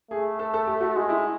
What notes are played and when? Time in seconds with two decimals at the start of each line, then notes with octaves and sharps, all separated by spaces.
0.11 A3 G#4
0.39 A4
0.54 A4
0.67 G4
0.81 F#4
0.95 G#3 F#4
1.09 E4